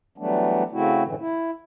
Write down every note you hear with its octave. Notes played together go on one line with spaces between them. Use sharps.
E3 F#3 G3 A3 B3 D4
C#3 A3 C4 E4 F#4
F#2 A2 D3 E3
E4